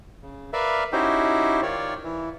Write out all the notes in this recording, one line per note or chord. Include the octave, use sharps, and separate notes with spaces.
C#3
A#4 B4 D5 E5 F5
C#4 D#4 E4 F#4 G4 C5
D#3 F4 C#5 D5
E3